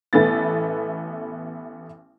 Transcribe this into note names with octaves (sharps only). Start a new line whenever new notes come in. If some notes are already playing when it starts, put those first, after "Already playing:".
A1 A3 B3 A6